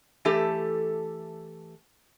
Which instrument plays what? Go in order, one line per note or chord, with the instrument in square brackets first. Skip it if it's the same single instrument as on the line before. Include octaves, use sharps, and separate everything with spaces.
[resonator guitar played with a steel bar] E3 A3 G4 A4